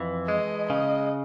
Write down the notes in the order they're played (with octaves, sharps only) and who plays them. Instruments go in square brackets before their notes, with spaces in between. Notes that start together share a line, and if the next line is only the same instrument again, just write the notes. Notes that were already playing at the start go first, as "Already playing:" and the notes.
Already playing: [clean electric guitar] F2 E3
[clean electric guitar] G#3 [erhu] D#5
[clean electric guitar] C#3 [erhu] D#5